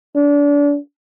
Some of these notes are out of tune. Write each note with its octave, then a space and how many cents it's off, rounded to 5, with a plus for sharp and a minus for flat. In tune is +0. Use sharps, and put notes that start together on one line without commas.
D4 -30